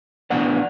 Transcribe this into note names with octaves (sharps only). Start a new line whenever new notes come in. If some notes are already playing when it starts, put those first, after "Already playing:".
A2 E3 B3 D4 D5 F#5